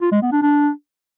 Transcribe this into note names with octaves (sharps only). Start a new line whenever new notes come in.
F4
G#3
B3
D4
D4